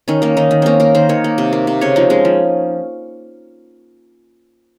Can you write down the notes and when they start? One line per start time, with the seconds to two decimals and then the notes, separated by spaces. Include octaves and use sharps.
0.08 D#3 C#4
0.22 A#3 C#4
0.37 D#3 D#4
0.51 D#3
0.62 A#3 C4 C#4
0.80 A#3 A#4
0.95 D#3 C5
1.09 D#3 C#5
1.24 A#3
1.38 C3
1.53 A#3
1.67 C3
1.81 C#3 C#5
1.96 F3 D#4
2.10 G#3 C#4
2.25 F3